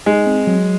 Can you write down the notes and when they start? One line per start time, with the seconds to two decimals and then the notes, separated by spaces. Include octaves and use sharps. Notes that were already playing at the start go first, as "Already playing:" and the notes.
0.06 G#3 D#4
0.26 C4
0.47 F#3